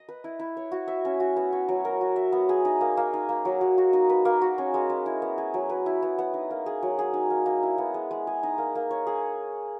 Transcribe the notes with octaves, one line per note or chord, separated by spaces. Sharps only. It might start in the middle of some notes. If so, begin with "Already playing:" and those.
Already playing: D#5
B4
E4
E4
C#5
F#4
E5
C#4
F#4
B3
C#5
F#3
A#4
F#4
E5
B3
G#4
D#4
A#3
A#3
D#4
A#3
F#3
F#3
F#4
D#4
B4
A#3
F#4
C#4
G#3
G#3
E4
B3
G#4
F#3
B4
E4
B3
B3
D#4
A#3
G#4
F#3
G#4
D#4
A#3
A#3
E4
B3
G#3
G#3
G#4
D#4
A#3
A#3
C#5
G#4